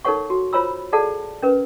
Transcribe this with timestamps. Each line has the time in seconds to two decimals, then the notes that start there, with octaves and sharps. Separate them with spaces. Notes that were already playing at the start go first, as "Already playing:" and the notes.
0.05 D#4 A4 A#4 C#5 F#5 C#6
0.30 F#4
0.53 F4 C5 C#5 A#5 B5 E6
0.93 G#4 A4 D5 F#5 A5
1.42 C#4 A#4 B4